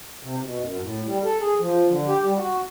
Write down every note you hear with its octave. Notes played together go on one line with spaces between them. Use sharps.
C3
B2
F#2
A2
G3
A4
G#4
F3
D3
G4
G3
F#4